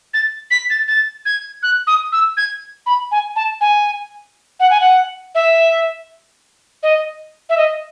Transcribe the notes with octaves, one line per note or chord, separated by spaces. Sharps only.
A6
B6
A6
A6
G#6
F#6
D#6
E6
G#6
B5
G#5
A5
G#5
F#5
G#5
F#5
E5
D#5
E5
D#5